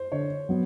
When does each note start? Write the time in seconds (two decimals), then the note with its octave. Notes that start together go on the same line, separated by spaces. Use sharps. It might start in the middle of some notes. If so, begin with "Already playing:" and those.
Already playing: C5
0.12 D3 C#5
0.49 F#3 B3